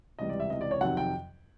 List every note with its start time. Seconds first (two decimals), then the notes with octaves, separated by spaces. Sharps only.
0.19 C#2 C3 E3 G3 D#5
0.29 D5
0.40 E5
0.50 C#2 C3 E3 D#5
0.61 D5
0.71 C#5
0.81 F2 C3 D#3 F#3 F#5
0.97 G5